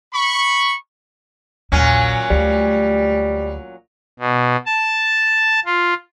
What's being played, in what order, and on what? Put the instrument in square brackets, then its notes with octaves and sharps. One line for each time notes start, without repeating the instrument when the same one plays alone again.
[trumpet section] B5 C#6
[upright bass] A#1 D#2 [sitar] A#2 F#3 C#4
[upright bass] D2 A3 [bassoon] G3
[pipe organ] B2
A5
F4